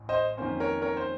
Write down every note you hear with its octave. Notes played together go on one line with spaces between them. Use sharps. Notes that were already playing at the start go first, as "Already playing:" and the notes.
Already playing: A1 A2
C5 D#5
F2 D#3 A#3 C#4 C5
A#4 C#5
A#4 C#5
C5